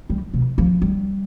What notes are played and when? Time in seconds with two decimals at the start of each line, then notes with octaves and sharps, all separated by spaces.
0.10 G3
0.34 B2
0.58 F3
0.82 G3